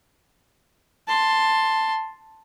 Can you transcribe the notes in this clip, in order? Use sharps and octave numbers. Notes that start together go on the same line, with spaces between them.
A5 C6